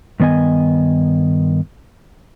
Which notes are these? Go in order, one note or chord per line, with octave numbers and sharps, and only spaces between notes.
G2 D#3 B3 D#5 G#5